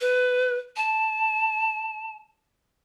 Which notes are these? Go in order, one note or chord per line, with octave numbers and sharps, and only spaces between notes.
B4
A5